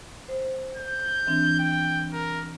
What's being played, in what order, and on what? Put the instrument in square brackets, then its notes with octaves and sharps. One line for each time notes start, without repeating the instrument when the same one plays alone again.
[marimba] C5
[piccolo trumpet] G6
[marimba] E3 C4 D4
[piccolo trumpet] G5
A#4